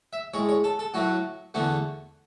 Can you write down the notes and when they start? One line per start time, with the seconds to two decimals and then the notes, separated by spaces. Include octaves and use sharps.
0.13 E5
0.34 A2 G#3 C#5
0.49 C#5
0.64 A4
0.79 A4
0.94 A2 F#3 A3 F#4
1.54 E2 D3 A3 F#4